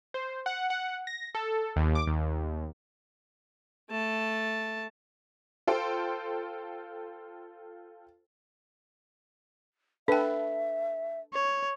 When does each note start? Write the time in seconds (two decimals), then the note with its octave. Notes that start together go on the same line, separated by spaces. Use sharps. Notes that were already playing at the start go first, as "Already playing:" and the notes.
0.14 C5
0.46 F#5
0.70 F#5
1.07 A#6
1.35 A4
1.76 D#2
1.95 D6
2.07 D#2
3.90 A3 A5
5.67 F4 A4 C5 G5 C6
10.08 D4 A4 B4 E5 G5
11.33 C#5